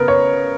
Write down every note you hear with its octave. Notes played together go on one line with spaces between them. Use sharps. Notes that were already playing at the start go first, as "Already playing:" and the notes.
Already playing: C#3 B3 A#4
C#5